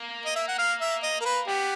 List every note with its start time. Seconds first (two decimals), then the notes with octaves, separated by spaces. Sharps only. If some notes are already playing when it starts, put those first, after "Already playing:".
Already playing: A#3
0.26 D#5
0.36 E5
0.48 F#5
0.58 F5
0.81 E5
1.03 D#5
1.21 A#4
1.25 B4
1.47 B3 G4